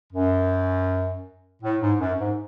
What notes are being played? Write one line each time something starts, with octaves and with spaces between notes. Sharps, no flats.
F#2
A2
G#2
F#2
G#2